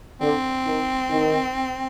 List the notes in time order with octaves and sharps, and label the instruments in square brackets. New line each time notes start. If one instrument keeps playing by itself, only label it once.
[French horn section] D3 [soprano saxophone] C4
[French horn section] D#3
D#3